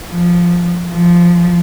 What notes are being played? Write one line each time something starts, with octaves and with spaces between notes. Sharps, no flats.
F3
F3